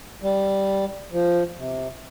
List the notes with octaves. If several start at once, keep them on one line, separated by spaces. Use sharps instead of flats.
G3
F3
C3